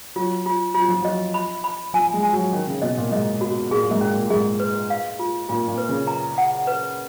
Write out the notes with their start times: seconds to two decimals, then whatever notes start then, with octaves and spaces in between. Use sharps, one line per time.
0.16 F#3 F4
0.46 F4
0.75 F#3 F4
0.88 F3
1.02 F#3 D#5
1.34 B5
1.64 B5
1.93 F3 G#5
2.13 G#3
2.23 G#5
2.33 F#3
2.53 D#3 C#4
2.67 C#3
2.82 B2 D#5
2.97 A#2
3.12 G#2 D#5
3.41 F#4
3.71 A#2 G#4
3.83 A#2
3.91 G#2
4.01 C#4
4.11 A#2
4.30 G#2 G#4
4.60 B4
4.90 F5
5.19 F4
5.49 A#2 F4
5.68 A#2
5.78 B4
5.89 C#3
6.07 A#5
6.38 F#5
6.67 B4